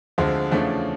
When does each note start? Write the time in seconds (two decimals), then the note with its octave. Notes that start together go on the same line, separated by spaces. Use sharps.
0.18 D2 D3 F3 G#3 C4
0.52 E2 C#3 F3 A3 D4